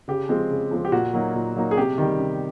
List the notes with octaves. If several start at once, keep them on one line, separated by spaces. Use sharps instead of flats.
C#3 G4
F3 G#3 C4
C#3
F3 G#3 C4
G4
A#2 F#4
F#3 A#3 D#4
A#2
F#3 A#3 D#4
G#4
C3 G4
D#3 G3
C3